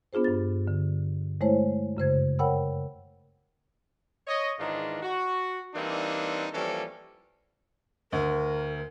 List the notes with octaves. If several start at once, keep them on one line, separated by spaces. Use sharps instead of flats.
B3 D4 F4 G#4 C5
G2 A6
D3
G#3 A3 E4 C5 C#5
F#2 C#3 C5 G#6
A#4 C#5 F#5 G5 B5 E6
C#5 D#5
G#2 D#3 E3 G#3 D4 F4
F#4
E3 G3 A#3 C4 D4 D#4
E3 F3 G3 A#3 C#4 A4
D2 A#4